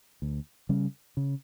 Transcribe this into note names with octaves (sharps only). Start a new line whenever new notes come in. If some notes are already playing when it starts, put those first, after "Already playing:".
D2
C#3 G3 C#4
C#3